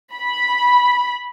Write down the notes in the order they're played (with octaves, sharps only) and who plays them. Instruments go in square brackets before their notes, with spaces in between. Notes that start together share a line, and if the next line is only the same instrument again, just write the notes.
[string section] B5